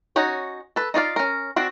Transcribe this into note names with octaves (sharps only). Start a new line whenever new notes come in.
C#4 D#4 F#4 C#5
A4 B4
D#4 F4 D5 F5
C#4 A#4
C4 D4 F#4